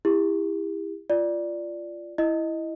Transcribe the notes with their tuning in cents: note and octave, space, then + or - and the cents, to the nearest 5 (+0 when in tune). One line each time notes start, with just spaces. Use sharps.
E4 +0 G4 +40
F4 -20 D5 +0
E4 +0 D#5 +0